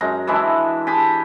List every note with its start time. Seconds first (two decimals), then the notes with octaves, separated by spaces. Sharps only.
0.01 F#2 G#3 A#5
0.27 E3 G#3 D4 E4
0.87 G4 G#4 A5 B5